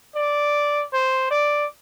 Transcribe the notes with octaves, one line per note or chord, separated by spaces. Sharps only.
D5
C5
D5